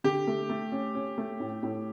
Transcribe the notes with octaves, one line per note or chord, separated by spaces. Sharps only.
D3 G4
A3
A3
C#4
C#4
A3
A2
A2